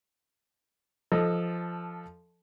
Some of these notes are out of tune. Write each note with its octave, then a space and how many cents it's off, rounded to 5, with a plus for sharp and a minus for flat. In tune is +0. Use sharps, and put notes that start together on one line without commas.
F3 -5 A4 +0 D#5 +0